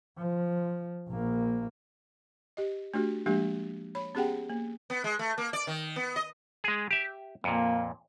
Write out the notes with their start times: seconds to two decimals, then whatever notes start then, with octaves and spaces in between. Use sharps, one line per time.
0.18 F3
1.10 A#1 A#3
2.57 G4 D#5
2.94 A3 D4 F#4 G4
3.26 F3 G#3 A#3 D4 G4
3.95 C#5 B5
4.15 B3 C#4 G4 G#4 F#5 G5
4.50 A#3
4.90 B3
5.04 G#3
5.19 A3
5.38 A#3
5.53 D5
5.67 D#3
5.96 B3
6.16 D#5
6.64 G#3 G#4
6.91 G4 E5
7.44 F2 A#2 A#3